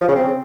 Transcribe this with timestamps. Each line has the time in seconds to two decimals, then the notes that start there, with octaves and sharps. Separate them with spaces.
0.01 F3
0.08 C#3
0.15 C4